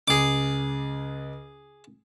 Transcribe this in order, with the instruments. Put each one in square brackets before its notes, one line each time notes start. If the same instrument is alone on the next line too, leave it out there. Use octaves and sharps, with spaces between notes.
[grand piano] C#2 [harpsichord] G#4 D6